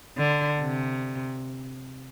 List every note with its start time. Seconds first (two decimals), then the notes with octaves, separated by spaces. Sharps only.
0.17 D3
0.60 C3